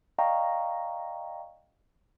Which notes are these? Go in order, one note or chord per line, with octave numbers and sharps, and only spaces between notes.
D5 D#5 F5 G5 A#5 C#6